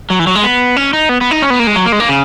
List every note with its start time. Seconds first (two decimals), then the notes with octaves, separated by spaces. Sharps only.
0.10 F#3
0.19 E3
0.27 F#3
0.35 G#3
0.44 B3
0.76 C#4
0.93 D#4
1.09 B3
1.21 B3
1.31 D#4
1.42 C#4
1.50 B3
1.60 A#3
1.67 G#3
1.76 F#3
1.86 A#3
1.92 G#3
2.00 A#3
2.09 C#3